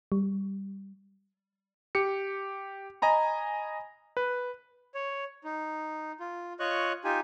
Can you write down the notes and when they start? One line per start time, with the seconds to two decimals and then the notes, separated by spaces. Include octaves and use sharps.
0.12 G3
1.95 G4 C#7
3.02 D#5 G#5 A#5 B5
4.17 B4
4.95 C#5
5.44 D#4
6.20 F4
6.60 F4 C#5 D#5 C#6 F#6
7.04 D#4 F4 G4 G#5